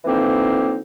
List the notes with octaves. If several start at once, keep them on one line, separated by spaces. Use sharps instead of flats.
D3 E3 F3 A#3 C4 D#4